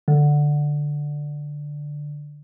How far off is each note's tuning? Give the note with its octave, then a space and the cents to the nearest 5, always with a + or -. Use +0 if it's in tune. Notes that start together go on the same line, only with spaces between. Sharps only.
D3 +5